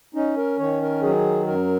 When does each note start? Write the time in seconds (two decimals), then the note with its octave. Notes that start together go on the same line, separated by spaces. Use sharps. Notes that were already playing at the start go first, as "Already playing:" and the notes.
0.15 C#4 D#4
0.37 A#4
0.59 D#3 C#5
0.81 A#4
1.02 F#3 G#4
1.47 F#2 A#4